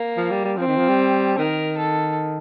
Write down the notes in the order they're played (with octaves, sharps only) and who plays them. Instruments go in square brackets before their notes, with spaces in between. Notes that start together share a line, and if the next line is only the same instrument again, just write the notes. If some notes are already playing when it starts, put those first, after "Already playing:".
Already playing: [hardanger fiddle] A#3
[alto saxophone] F3
G3
G3
[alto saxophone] F3 [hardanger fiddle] C4
[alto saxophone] D#3
F3
G3
[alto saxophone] D#3 [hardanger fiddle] A#4
[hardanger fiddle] A4